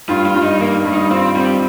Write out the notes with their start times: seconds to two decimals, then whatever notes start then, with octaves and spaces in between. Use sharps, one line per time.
0.09 G2 F4
0.26 F4
0.35 G2
0.43 D#4
0.60 D#3 A#3
0.85 G2
0.94 D#4
1.11 C4 F4
1.36 G3 C4